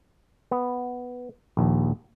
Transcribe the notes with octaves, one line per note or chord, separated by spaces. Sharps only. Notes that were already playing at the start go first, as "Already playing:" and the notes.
B3
A#1 D#2